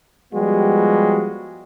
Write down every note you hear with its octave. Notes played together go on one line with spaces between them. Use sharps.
F3 G3 G#3 B3 F#4 G4